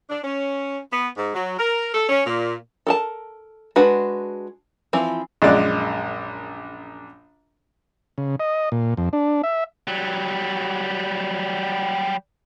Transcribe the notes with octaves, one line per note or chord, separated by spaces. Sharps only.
D4
C#4
B3
G#2
F#3
A#4
A4
C#4
A#2
A4 A#4 A5
G#3 D4 F#4 B4 F#5
E3 F3 C4
A#1 F#2 G#3 D5 F#6
C#3
D#5
A#2
F2
D4
E5
F#3 G3